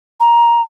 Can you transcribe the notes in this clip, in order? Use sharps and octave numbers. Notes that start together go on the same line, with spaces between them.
A#5